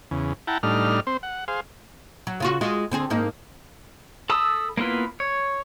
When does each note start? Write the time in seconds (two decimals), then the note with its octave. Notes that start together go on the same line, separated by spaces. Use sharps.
0.11 E2 C#3
0.47 E4 F#5 G5 A5 A#5
0.63 A2 G3 D4 D#4 F6
1.07 C4 C5
1.23 F#5
1.48 G#4 C5 F5
2.27 F#3
2.40 C#3 F4 F#4
2.61 G#3 F4 F#4
2.92 D3 C4 G#4
3.10 G#2 A#3 D#4
4.30 A4 A5 B5 D#6 E6
4.77 A#3 B3 E4 F4 B4
5.20 C#5